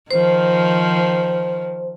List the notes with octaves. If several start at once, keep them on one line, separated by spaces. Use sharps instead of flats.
D#3 F3 C5